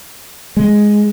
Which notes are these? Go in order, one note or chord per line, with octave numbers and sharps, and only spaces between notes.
G#3